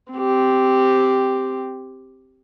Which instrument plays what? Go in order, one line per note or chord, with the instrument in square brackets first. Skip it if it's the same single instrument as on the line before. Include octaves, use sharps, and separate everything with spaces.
[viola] C4 G4